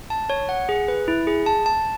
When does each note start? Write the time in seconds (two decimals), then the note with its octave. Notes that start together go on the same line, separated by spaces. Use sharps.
0.10 A5
0.30 C#5
0.49 F#5
0.69 G#4
0.88 B4
1.08 E4
1.27 G#4
1.46 A5
1.66 A5